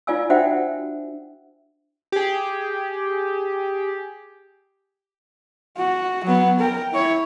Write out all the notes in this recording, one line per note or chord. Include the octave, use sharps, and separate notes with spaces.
E4 F4 D5 F5 G#5 E6
D4 F#4 C5 E5 F#5 G5
G4 G#4
F#4
F#3 B3
A#4 G5
E4 C#5